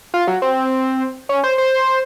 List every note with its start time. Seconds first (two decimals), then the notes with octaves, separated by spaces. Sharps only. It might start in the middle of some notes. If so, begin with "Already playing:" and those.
0.14 F4
0.28 F#3
0.42 C4
1.29 C#4
1.44 C5
1.58 C5